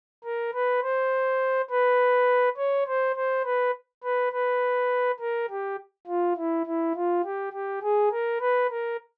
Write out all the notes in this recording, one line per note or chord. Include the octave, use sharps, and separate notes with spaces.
A#4
B4
C5
B4
C#5
C5
C5
B4
B4
B4
A#4
G4
F4
E4
E4
F4
G4
G4
G#4
A#4
B4
A#4